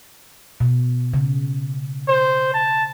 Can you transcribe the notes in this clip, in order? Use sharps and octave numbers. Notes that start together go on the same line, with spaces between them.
B2
C#3
C5
A5